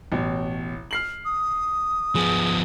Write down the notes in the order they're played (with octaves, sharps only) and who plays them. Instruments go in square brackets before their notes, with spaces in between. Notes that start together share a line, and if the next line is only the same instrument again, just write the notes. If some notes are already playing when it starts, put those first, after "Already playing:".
[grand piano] A1 B2 C#5
F6 C7 F#7
[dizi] D#6
[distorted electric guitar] F3 B3 [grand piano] G#4